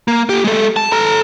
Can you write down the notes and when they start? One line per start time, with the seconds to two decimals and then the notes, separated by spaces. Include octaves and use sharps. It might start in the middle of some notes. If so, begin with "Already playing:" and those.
0.08 A#3
0.29 G4 A4
0.44 G#3 A4
0.76 A5
0.92 A4 A#5